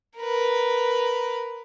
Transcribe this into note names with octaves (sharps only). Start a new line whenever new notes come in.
A#4 B4